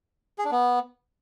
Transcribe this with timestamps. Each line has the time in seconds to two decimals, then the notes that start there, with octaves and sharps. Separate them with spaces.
0.38 G#4
0.45 D4
0.51 B3